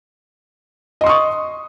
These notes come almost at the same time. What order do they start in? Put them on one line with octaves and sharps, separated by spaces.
D#5 C6 D#6 C#6